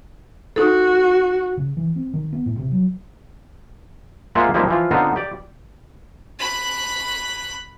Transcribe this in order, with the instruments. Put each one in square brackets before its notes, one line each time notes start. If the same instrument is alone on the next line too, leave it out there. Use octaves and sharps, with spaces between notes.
[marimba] D#4 A4 [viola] F#4
[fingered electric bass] C#3
E3
C4
D#3
B3
A2
C3
F#3
[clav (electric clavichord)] G#3 A#3 F4 C5 E5 F#5
F3 G3 A#3 C4 D#4 E4
E3 F3 F4
D3 B3 C4 D#4 F4 C5
G4 D5
[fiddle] B5 F#6